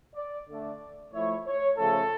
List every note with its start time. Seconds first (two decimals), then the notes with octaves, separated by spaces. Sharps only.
0.15 D5
0.48 D3 A3 D4 D5
1.13 F3 A3 E4 C#5
1.46 C#5
1.78 C#3 F3 A3 C#4 A4